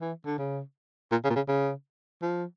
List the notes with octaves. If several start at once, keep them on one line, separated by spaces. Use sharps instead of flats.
E3
D3
C#3
A#2
C#3
A#2
C#3
C#3
F3